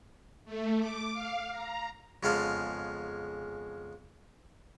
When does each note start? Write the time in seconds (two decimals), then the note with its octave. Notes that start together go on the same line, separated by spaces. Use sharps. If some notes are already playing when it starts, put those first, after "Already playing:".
0.45 A3
0.79 D6
1.13 F5
1.51 A#5
2.23 F2 C#3 G#3 B3 F5 A5